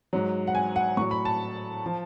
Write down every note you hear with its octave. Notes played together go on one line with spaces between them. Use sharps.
G#2 F#3
F#5
G#5
F#5
A2 F#3 C#6
B5
A5
F3